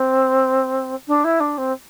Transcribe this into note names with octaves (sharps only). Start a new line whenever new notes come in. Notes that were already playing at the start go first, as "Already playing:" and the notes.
Already playing: C4
D4
E4
D4
C4